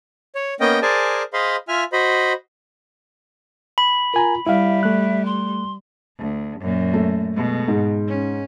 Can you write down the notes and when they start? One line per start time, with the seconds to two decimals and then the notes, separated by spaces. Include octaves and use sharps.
0.35 C#5
0.60 A#3 B3 C#4 D#5 G5
0.82 G#4 A#4 C5 D5 G#5 A5
1.33 G#4 C5 D#5 F5 B5 C6
1.68 F4 E5 G#5 F6
1.93 F#4 C5 D#5 B5
3.78 B5
4.14 F4 A#4 G#5 A#5
4.47 G3 E4 E5 F5
4.83 A3 F#6
5.26 C6
6.18 D2
6.60 F#2 A#2
6.93 A3
7.35 B2 G#3
7.68 G#2
8.08 C#4